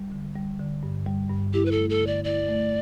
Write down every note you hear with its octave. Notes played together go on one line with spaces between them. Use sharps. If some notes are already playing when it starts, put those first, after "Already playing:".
Already playing: G3
D3
G3
D3
G2
G3
G2
E4 G4
B4
A4
A3
A4
D3
D5
E4 D5
A3